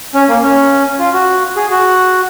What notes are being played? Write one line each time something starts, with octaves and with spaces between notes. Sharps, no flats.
C#4
A#3
C#4
F4
F#4
G#4
F#4